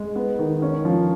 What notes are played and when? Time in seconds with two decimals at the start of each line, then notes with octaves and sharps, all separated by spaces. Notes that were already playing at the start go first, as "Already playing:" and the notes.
Already playing: G#3
0.16 B3
0.39 D#3
0.62 C#4
0.85 F3